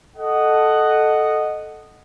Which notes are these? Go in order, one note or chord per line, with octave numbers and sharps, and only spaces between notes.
A4 D#5 F#5